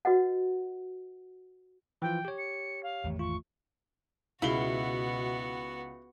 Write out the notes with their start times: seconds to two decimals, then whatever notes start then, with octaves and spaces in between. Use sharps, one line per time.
0.05 F#4 B4 D#5 F#5
2.02 E3 F3 F4 G5
2.25 G4 C#5
2.38 C#7
2.83 F5
3.04 G#1 E2 A3
3.19 F4 C#6
4.42 C#2 B2 B3 E4 F#4 F5 G7